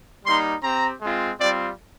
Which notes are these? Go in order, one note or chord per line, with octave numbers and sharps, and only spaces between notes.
G3 A#3 D#4 C6
C4 G4 A#5
G#3 C4 F4
G3 C4 F4 D5